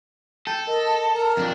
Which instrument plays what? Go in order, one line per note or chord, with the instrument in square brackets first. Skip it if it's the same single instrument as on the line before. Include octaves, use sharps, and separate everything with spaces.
[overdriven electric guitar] A4 [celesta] G5 G6 D#7
[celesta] A#4 [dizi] D#5
[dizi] A#4 [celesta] A#5
[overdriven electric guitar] F2 D4 [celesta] G5